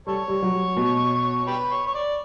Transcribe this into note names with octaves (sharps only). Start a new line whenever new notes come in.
G3 A4 C#5
G3
F#3
B2
G4 B4
C#5
C#5
D5